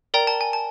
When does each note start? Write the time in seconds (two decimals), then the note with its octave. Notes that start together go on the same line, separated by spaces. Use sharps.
0.14 A#4 D5 G5 A#5
0.27 A5
0.41 G#5
0.53 A5